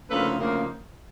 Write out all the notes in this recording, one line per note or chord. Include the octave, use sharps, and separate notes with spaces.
D2 C#3 F3 A#3 D#4 A4 B4
D2 C#3 F3 A#3 D#4